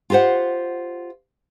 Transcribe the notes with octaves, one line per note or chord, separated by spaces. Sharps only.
F4 G4 A#4 C5 F#5